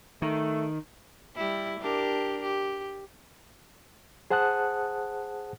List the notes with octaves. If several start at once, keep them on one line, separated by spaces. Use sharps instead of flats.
D#3 A3
G3 E4
D4 G4 A#4
G4
G#4 C5 F#5 A5 D#6 F#6